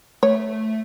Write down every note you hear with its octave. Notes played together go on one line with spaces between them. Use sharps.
A3 C#5